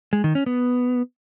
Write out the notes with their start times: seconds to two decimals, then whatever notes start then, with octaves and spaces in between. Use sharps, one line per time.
0.13 G#3
0.24 D#3
0.35 C#4
0.46 B3